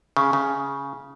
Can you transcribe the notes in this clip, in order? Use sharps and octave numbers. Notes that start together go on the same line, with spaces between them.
C#3
C#3